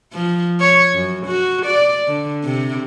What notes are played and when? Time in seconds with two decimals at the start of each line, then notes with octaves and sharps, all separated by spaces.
0.13 F3
0.60 C#5
0.95 F#2
1.26 F#4
1.66 D5
2.07 D3
2.44 C3